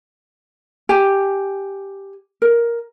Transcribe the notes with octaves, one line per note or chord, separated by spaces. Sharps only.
G4 G#5
A#4